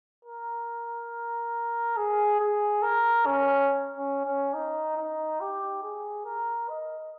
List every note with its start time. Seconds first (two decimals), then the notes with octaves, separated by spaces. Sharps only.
0.25 A#4
1.97 G#4
2.40 G#4
2.83 A#4
3.26 C#4
3.97 C#4
4.25 C#4
4.54 D#4
4.97 D#4
5.40 G4
5.83 G#4
6.25 A#4
6.69 D#5